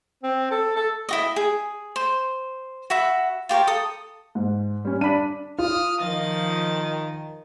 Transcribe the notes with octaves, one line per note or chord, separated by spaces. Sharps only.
C4
A4
A4
E4 F#4 D#5
G#4
C5
F#4 E5 B5
F4 G4 A#4 C#5
A4 D#6
G#2
G3 C#4
D4 B5 D#7
F4 D#6 F6
D#3 F3 D#5 A6